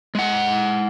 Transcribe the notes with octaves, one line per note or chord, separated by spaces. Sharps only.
G#3 F#5